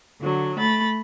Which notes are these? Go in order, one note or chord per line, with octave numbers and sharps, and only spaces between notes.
D3 F#3
A3 B5 A6